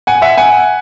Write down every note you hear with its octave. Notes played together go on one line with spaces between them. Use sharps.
F#5 G#5
E5 F#5
F#5 G#5